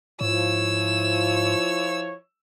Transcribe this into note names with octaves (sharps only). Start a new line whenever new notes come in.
G#2 F3 E4 F4 C#5 E6